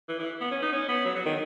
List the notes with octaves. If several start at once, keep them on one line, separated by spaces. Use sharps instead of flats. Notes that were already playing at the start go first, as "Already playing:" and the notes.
E3
E3
B3
C#4
D#4
C#4
B3
F#3
F#3
D#3